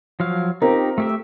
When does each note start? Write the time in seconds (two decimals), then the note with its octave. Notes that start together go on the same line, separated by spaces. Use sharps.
0.20 F3 F#3 F5
0.62 C4 D#4 F4 G4 A#4
0.98 A3 G4 E5